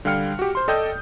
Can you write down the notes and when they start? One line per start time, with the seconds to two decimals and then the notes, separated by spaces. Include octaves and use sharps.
0.05 D3 G3 F5 G5 F6 C#7
0.39 F#4 G4
0.55 C5 C6
0.68 A4 D5 D#5 G5 D#6 G6